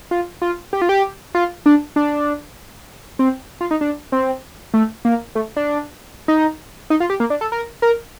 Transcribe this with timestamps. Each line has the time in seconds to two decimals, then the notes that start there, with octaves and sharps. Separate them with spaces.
0.11 F4
0.42 F4
0.73 G4
0.82 F4
0.89 G4
1.35 F4
1.66 D4
1.96 D4
3.19 C4
3.61 F4
3.71 D#4
3.81 D4
4.12 C4
4.74 A3
5.05 A#3
5.35 A3
5.56 D4
6.28 D#4
6.90 D#4
7.00 F4
7.10 G4
7.20 A#3
7.30 D4
7.41 A4
7.52 A#4
7.82 A#4